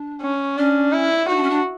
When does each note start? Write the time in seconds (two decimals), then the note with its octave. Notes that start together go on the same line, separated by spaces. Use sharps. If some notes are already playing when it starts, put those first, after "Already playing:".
Already playing: D4
0.22 C#4
0.58 C#4 D4
0.93 E4
1.28 D#4 F#4
1.36 D4
1.43 C#4
1.50 D4